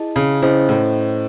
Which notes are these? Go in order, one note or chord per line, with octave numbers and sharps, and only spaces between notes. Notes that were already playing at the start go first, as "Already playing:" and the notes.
Already playing: E4 G#4 D#5 A5
C#3
C#3 C#4 E4 C5 D#5
A2